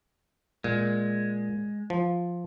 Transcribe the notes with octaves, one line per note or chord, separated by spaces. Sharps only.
A#2 G#3
F3